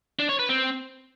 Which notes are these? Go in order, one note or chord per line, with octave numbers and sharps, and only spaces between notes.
D4
C#5
B4
C4